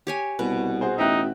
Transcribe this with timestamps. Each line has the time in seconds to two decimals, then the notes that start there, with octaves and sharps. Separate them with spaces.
0.07 G4 C#5 G#5
0.39 C2 B2 B4
0.81 F#4 G#4 C5
0.98 A1 D#4 E5 G5 F#6